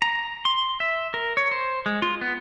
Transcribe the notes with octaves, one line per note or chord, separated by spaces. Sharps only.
A#5
C6
E5
A#4
C#5
C5
G#3
F4
B3